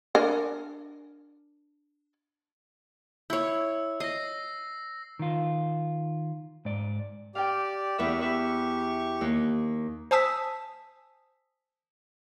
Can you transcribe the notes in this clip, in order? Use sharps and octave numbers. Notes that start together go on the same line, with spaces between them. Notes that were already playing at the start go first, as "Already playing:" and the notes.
D4 A#4 G#5
E4 C#5 E6
D#5 A#6 C7
D#3 F4
G#2 D5
G4 D5 F5 G5
E2 G4 B4 E5 C#6
G4 B4 E5 C#6
D#2
C5 G#5 A5 D#6 E6 B6